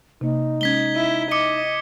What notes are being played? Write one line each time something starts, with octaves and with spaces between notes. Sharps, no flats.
C3 A#3 D#4
G#3 C#4 G#6 B6 G7
E4
D#5 D6 D#6 C#7 G7